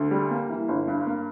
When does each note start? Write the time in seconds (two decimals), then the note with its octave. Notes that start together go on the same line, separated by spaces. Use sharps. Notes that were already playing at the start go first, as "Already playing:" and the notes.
Already playing: D2
0.11 G3
0.31 A#3
0.50 E3
0.68 G1
0.88 G2
1.07 A#3